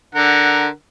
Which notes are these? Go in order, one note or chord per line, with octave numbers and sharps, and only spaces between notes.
D3 A#4 F#5